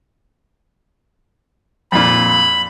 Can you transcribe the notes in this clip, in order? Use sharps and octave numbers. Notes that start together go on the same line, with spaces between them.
F2 A#2 B5